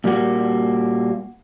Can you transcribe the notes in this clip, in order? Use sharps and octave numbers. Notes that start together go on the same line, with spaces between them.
A#2 G3 A#3 F#4